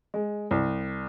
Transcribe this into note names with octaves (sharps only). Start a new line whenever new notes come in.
G#3
C2